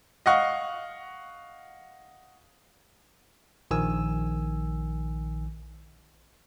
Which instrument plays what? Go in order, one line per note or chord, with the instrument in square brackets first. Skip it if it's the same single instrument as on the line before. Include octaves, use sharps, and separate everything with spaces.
[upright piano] D#5 F5 F#5 C#6
[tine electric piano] A#1 D#3 G#5 E6